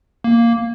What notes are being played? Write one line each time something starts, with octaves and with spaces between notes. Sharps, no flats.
A#3